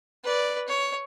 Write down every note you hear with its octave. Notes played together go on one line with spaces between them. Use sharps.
B4 D5
C#5